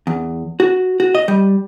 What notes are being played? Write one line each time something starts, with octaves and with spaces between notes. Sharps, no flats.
E2
F#4
F#4
D#5
G3